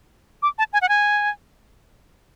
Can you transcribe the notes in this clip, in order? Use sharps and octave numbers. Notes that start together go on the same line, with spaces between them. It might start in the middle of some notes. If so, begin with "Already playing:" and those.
D6
A5
G#5
F#5
G#5